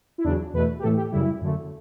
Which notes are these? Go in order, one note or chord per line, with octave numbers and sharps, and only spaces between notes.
E4
E2 C#3 F#3 D4
E2 B2 A3 B4
G4
A2 E3 A3 A4
G4
F#2 C#3 G3 E4
F#2 D3 A3